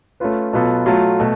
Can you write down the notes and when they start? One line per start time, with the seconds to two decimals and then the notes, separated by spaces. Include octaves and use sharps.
0.20 A3 C#4 F4 B4
0.53 B2 F#3 B3 F4 A4
0.86 F#3 A3 F4 A4
1.20 B2 A3